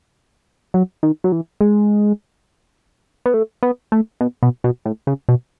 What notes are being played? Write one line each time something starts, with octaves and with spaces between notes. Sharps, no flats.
F#3
D#3
F#3
E3
G#3
B3
A3
B3
A3
B2
B2
B2
A2
C#3
B2